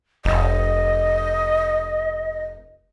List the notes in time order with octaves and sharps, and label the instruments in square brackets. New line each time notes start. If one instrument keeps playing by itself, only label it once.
[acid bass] F1 [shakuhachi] D#5